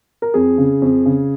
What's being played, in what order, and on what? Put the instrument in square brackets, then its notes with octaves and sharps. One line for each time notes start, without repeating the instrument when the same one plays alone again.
[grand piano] A#4
F2 G#4
C#3
F2
C#3